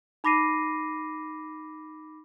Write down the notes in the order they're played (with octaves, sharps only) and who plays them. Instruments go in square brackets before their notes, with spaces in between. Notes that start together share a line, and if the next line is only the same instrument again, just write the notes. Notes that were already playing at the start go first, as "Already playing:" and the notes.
[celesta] D#4 B5 D6 A#6 C7 D#7